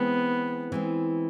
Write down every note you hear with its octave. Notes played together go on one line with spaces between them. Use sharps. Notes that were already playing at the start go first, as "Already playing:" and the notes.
Already playing: E3 G#3 B3 C4
E3 G#3 C4